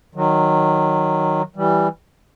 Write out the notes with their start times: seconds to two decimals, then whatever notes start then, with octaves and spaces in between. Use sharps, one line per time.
0.15 D#3 F#3
1.56 E3 G3